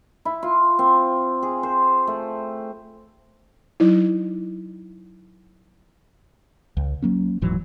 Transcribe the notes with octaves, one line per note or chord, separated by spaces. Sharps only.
E4
F4
C4
G#4
C5
A3
F#3 D#4 E4
C#2
F#3 A#3 C#4
D#1 G#2 E3 F#3